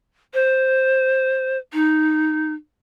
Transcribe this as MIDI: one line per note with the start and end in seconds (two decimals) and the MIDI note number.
0.34 1.57 72
1.73 2.52 63